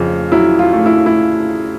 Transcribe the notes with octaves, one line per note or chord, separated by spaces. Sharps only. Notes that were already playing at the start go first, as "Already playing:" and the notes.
Already playing: F2 C#3
F#3 E4
F4
A3
E4
E4